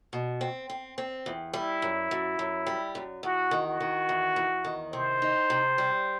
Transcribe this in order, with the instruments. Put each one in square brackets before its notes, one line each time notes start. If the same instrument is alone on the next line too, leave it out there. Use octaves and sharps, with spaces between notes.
[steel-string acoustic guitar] B2
C4
C4
C4
E2
[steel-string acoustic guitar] G3 [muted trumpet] E4
[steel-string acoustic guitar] F#2
F#2
F#2
G3
F#2
[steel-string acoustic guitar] E2 [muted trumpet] F#4
[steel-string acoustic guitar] D#3
[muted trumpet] F#4
[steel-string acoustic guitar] D#3
E2
E2
D#3
[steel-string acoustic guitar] C3 [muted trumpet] C5
[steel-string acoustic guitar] D#4
C3
G3